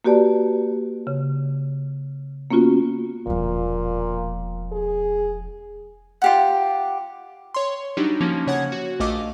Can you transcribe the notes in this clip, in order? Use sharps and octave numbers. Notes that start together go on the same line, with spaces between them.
A#3 F#4 G4 B4 D5 A5
C#3
A#3 B3 C#4 F4 F#4
E1 A#2 F3
G#4
F4 G4 F#5
C#5 C6
F#3 G3 D4 D#4 F#4 G4
F3 A#3 C#4
C#3 C#5 F#5 G#6
F#4
A#1 A3 D#5 F5 D6